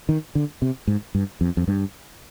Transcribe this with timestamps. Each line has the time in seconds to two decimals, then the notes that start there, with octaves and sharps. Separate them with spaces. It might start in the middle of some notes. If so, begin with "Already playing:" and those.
0.09 D#3
0.35 D3
0.62 C3
0.87 G#2
1.15 G2
1.41 F2
1.57 F2
1.68 G2